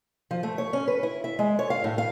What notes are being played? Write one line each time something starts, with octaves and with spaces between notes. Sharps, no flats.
F3
A3
C#5
C#4
B4
E4
E5
G#3
C#5
F5
A2
F5